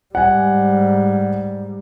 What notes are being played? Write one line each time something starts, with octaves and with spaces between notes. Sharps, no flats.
G#2 G3 F#5 G#5